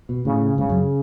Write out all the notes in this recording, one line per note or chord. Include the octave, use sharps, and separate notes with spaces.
B2
A2 C#3
G#2 C#3
F#2